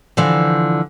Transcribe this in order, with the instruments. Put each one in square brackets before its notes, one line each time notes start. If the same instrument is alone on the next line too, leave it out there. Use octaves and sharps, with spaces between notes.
[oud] D3 E3 F3